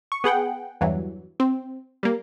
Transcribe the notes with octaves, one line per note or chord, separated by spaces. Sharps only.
C#6
B3 G#4 F#5 G5
E2 G2 E3 F#3
C4
G3 A#3